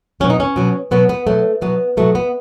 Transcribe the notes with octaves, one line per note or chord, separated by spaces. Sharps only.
B2 F#3 C#4
D#4
C#4
B2 F#3
B2 F#3 B3
B3
B2 F#3 A3
B2 F#3 B3
B2 F#3 A3
B3